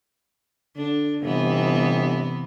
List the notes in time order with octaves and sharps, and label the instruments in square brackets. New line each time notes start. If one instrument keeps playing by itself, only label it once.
[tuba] D3 [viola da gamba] D4
[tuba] G1 [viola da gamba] C3 E3 B3